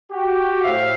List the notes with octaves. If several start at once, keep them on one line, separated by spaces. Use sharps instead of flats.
F#4 G4
A2 C5 E5 F5